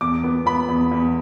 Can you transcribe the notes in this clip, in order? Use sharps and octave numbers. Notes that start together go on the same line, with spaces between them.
E2 D6
B3
B3 B5
E2
E2